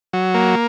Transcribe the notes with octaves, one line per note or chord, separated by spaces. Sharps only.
F#3
A#3